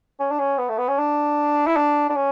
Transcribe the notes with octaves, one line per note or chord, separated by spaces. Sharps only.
C#4
D4
C#4
B3
A3
B3
C#4
D4
E4
D4
D4
C#4